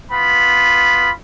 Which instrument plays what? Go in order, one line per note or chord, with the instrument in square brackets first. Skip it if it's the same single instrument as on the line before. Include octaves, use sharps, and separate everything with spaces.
[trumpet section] B3 F4 B5